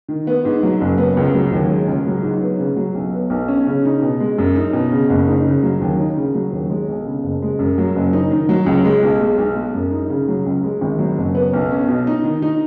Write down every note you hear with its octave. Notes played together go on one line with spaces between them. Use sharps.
D#3
B3
G#2
F#3
F#1
B3
C#2
F#3
D#2
G#3
C#2
F#3
G#2
B3
C#3
F#3
B1
B3
B1
C#4
C#3
D#4
B2
G#3
F#2
D#4
B2
C#3
F#1
D#4
C#3
F#3
D#2
D#4
C#3
F#3
D#2
G#3
B1
C#3
F#1
G#3
F#2
F#3
F#1
D#4
D#3
F#3
C#2
G#3
B1
G#3
B1
G#3
F#2
D#4
C#3
F#3
C#2
G#3
G#1
F#3
F#1
B3
B1
C#4
B2
D#4
D#3
D#4